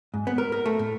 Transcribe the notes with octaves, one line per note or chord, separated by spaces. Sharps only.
G#2
B3
A#4
A#4
A3
A2